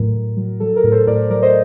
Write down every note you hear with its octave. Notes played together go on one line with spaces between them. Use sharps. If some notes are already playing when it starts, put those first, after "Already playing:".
Already playing: A2 F#3 A#4
A2
F#3
F#3 A4
A#4
A2
A4 C5
A2 A#4 D5
F#3 A#4 D5
C5 D#5